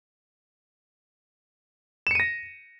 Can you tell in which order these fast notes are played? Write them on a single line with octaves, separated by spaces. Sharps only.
E7 C#7 D#7 A#6